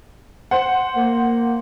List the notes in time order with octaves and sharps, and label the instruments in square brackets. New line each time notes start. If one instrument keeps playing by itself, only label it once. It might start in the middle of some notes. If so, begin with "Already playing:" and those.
[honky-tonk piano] C5 F#5
[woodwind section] A#3